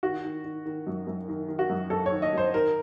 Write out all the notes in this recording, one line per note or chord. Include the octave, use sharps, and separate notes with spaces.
D#3 F#4
D#3
D#3
D#3
F#2
F#2
D#3
D#3
F#4
F#2
F#2 A4
C#5
D#3
D#5
F#2 C5
D#3 A#4